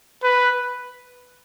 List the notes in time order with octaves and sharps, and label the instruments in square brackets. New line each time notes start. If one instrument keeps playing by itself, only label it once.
[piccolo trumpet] B4